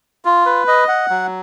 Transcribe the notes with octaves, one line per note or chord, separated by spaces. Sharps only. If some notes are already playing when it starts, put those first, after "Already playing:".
F4
B4
D#5
F#5
F#3